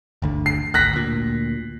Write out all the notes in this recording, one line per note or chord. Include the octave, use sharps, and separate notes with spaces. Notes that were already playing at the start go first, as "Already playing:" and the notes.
G1 D2 D3
C7
G#1 D2 F#6 A#6 B6
D2 A#2